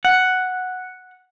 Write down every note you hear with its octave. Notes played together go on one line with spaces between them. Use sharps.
F#5